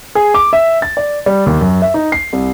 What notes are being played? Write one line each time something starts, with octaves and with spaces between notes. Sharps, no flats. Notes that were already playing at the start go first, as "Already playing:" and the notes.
G#4
D6
E5
A6
D5
G3
D#2
F#2
E5
D#4
C7
C2